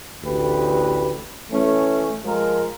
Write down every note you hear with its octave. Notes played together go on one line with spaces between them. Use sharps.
A1 D2 G4 B4
E3 A3 C#4
F3 G#3 A#4